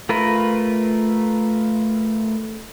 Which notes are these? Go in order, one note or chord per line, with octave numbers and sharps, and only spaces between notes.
A3 F4 A#4 B4